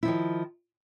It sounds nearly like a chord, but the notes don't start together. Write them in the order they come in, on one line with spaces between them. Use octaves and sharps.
E4 F3 D#3